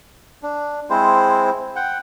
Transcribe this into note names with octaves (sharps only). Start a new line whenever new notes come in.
D4
G#3 C4 E4 C5
F#5 G5